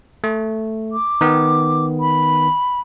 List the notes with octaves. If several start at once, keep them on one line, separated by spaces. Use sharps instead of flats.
A3
D6
D#3 B3
B5